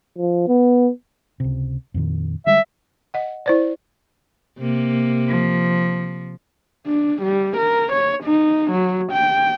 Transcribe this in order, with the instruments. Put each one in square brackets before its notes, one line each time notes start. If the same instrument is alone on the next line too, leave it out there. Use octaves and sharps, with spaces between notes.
[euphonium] F3
B3
[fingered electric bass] C#2 C3
F2 A#2 D#3
[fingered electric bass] D3 G3 G#3 [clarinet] E5
[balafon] D#5 F#5
E4 C5 D5
[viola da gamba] C3 A#3
[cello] F3
[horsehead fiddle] D4
G3
A#4
C#5
D#4
F#3
G5